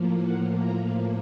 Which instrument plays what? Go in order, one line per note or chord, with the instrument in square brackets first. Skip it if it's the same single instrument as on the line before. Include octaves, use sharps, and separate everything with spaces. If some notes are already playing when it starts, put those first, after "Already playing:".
Already playing: [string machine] A2 F3 A#3
F#5
A#5